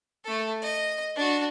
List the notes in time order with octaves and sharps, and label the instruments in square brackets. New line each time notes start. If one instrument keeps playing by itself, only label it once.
[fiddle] A3 A4
D#5
D4 F#4